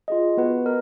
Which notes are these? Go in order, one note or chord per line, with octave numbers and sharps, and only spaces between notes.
F4 G#4 D#5
B3 F#4 B4 F#5
A#4 D#5